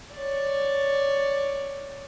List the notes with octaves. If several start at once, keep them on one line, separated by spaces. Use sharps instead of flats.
C#5 D5